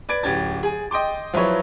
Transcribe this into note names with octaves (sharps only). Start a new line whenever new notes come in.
B4 D5 G#6 D7
D1 C#4 G4 G#6 A6
G#4 G#5
D#5 G5 C6 D6
F3 F#3 E4 B4 C#5